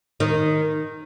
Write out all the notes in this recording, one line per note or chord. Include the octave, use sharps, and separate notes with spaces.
D#3